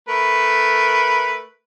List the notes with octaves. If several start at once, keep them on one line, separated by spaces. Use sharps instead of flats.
A3 A#4 B4